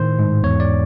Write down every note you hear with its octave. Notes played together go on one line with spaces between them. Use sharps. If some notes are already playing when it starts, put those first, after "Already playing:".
Already playing: A2 D#3 C5
G#2
E2 C#5
D5